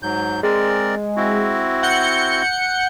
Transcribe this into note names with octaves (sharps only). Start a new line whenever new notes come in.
G#2 F#3 G6
G#3 C4 A#4 D5
C4 E4 F#4
F#5 G6 C#7